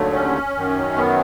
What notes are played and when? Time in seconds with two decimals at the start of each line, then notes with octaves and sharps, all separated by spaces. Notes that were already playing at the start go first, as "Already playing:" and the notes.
Already playing: D#2 D3 F#3 A3
0.13 C#4
0.55 F#2 D#3 F#3
0.97 B3